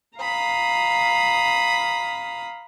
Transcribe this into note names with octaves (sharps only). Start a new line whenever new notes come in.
F5 A#5 B5 D#6